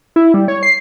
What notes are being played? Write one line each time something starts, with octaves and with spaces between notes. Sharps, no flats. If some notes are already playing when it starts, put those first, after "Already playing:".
E4
G3
C#5
C7